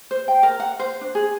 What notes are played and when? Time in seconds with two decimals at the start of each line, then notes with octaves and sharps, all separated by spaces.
0.11 C5
0.28 G5
0.43 A#4
0.60 F#5
0.80 C5
1.01 D4
1.15 G#4